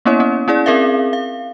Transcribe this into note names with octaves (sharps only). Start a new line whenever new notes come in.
A#3 B3 C#4 E4 C#5
C#4
C#4 E4 G#4 D5
C4 G#4 A#4 E5 F5
F5